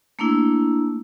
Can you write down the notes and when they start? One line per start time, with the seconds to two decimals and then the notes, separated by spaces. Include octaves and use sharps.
0.19 A3 A#3 D4 E4